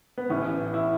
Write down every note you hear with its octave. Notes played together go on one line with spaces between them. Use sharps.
B3
A1 A2 E3 C#4
E4